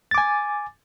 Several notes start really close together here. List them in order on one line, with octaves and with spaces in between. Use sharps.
A6 D6 G#5